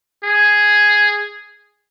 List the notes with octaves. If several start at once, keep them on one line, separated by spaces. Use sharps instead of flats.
G#4